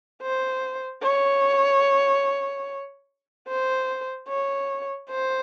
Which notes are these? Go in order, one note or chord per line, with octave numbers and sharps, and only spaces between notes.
C5
C#5
C5
C#5
C5